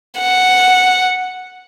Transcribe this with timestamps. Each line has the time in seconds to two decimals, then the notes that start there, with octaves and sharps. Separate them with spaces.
0.19 F#5